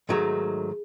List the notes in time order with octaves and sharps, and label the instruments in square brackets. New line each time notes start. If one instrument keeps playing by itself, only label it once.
[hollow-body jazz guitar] G#2 D#3 F#3 A3 D#4 [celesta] G#4